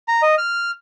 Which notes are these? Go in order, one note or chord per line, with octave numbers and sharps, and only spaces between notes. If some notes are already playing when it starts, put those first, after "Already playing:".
A#5
D#5
F6